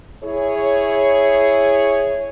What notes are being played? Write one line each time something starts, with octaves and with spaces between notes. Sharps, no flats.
E4 G#4 C#5